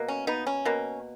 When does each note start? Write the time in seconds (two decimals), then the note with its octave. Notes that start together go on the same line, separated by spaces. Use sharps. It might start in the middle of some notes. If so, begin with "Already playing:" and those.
Already playing: B2 A#3
0.08 C#4
0.27 B3 D#4
0.47 C#4
0.65 B2 A#3